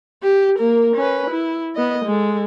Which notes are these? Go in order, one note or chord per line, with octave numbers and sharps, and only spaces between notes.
G4
A#3 A#4
C#4 B4
E4
B3 D#5
G#3 A4